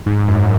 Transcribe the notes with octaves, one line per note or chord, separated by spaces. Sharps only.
G#2
F#2